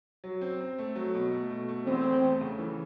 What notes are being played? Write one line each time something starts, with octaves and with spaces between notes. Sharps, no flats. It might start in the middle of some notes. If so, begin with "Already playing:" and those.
F#3
C4
C4
A3
F#3
B2
A3
B2
A3
E2 C4
E2
A3
C#3
E3